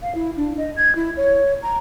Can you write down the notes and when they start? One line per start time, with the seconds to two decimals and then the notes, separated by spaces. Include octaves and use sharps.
0.02 F5
0.15 E4
0.37 D4
0.57 D#5
0.76 G#6
0.95 E4
1.16 C#5
1.62 A#5